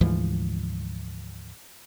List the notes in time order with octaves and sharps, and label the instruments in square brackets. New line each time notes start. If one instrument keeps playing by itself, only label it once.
[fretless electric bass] D2 G#2 E3 F3